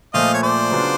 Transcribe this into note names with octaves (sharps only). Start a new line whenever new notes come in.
A#2 F3 A3 D#5 F5
C#5
C5 D5
C#3 F#3 B3 D4 F4